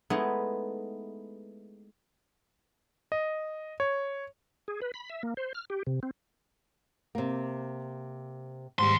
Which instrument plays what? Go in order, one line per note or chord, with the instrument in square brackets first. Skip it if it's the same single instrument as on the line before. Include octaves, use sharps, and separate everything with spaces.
[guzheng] G#3 A3 B3 D#4 E4
[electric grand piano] D#5
C#5
[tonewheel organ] G#4
B4
B5
E5
A#3
C5
F6
G4
C3
C4
[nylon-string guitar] C3 A#3
[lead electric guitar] D#2 C6 [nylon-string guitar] G#2 G3